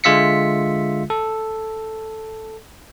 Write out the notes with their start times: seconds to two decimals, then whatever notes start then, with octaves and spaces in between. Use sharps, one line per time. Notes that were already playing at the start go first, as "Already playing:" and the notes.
0.04 D3 G#3 F4 E5 B6 C#7
1.10 A4